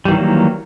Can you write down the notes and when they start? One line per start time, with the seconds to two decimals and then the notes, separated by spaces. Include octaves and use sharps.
0.05 G3
0.08 E3
0.11 D#3
0.14 F#3
0.17 A#3